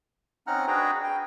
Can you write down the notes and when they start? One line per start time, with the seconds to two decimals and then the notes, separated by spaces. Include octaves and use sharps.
0.47 C4 C#4 D#4 F#5 A#5 F6
0.68 D4 F#4 G#4 B4 G5 A#5
1.04 G5